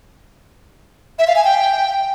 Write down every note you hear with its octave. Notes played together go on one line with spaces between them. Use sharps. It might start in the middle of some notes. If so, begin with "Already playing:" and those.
E5
F5
G#5
G5